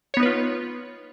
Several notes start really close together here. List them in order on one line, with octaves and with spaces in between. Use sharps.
C#5 B3 D#4 B4 F4